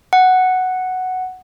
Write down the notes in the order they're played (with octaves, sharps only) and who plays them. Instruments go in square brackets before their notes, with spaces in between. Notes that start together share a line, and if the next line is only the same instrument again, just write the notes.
[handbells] F#5